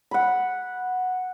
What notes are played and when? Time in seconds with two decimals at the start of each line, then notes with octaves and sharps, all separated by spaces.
0.11 F#5 B5